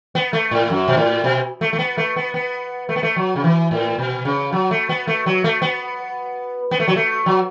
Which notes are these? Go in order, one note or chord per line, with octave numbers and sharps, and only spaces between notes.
B3
A3
A2
F#2
B2
A2
B2
A3
A3
B3
A3
B3
B3
A3
B3
A3
F#3
C#3
E3
A2
B2
C#3
F#3
A3
B3
A3
F#3
A3
B3
B3
A3
F#3
A3
F#3